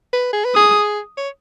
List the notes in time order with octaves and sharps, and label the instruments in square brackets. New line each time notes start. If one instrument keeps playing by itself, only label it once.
[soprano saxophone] B4
G#4
B4
[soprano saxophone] G#4 [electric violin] D#6
[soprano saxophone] C#5